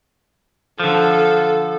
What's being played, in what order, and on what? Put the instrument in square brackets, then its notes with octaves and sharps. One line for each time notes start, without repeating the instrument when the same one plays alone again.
[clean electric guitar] D3 F3 [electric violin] A4